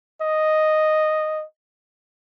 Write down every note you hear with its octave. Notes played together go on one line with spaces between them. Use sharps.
D#5